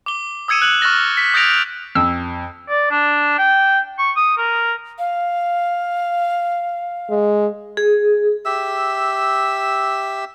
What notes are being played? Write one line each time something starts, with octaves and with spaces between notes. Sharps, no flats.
D6 G7
D#6 E6 G#6 C#7 D#7 E7
F#6 G#6 F#7 G7
C#6 F6 F#6 A6 A#6 G7
B6
D#6 G6 A6 A#6 D7 F7
F2 E6
D5
D4
G5
C#6
D#6
A#4
F5
G#3
G#4
G4 E5 E6